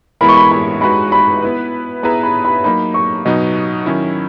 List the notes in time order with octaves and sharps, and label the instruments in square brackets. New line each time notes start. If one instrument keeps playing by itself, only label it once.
[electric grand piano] E3 G#3 B3 E4 A#4 [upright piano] B5
[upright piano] C#6
B5
B5
[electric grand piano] G#3 D#4 F#4 B4 [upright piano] B5
[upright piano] B5
[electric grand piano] B3 E4 B4
[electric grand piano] B3 E4 G#4 B4 E5 [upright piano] A#5
[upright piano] B5
B5
[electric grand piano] F#3 A#3 D#4 [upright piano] B5
[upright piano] C#6
[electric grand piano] B2 F#3 B3 D#4 [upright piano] D#5
[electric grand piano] D#3 F#3 C#4 E4